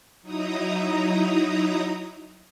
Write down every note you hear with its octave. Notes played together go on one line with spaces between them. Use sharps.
F#3 D#4 E4 A#5 D#6